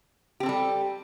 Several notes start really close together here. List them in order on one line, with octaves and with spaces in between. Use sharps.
G4 C4 A4 G3